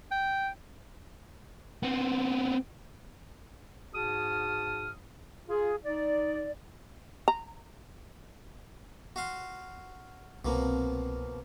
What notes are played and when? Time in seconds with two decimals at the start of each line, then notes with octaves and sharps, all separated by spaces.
0.11 G5
1.83 B3 C4
3.94 G#2 F#4 G#4 A5 D#6 F6
5.48 F4 G#4
5.84 D#4 D5
7.28 A#5
9.16 F#4 F5 C6
10.45 C2 B2 F3 A#3 C4